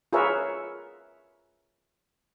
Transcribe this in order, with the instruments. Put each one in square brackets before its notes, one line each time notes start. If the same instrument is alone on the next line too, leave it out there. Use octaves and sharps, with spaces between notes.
[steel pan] F4 G#4 A#4 B4 C#5 E5